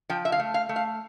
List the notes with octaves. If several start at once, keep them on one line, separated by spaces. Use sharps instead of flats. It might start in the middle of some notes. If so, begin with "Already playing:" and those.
F3 G5
E5
F5
A3
F5
A3
F5